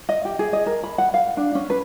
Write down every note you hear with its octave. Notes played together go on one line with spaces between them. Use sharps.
D#5
G4
G#4
D#5
A#4
B5
F#5
F5
D4
C#4
B4